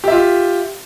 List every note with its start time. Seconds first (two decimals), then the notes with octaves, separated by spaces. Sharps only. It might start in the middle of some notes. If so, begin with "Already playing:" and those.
0.04 G4
0.08 E5
0.12 F4